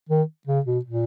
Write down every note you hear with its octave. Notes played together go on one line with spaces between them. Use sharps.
D#3
C#3
B2
A#2